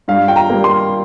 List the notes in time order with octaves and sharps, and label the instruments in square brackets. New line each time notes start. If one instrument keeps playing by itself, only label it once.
[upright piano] G2 F5
G5
A#5
G3 A#3
C6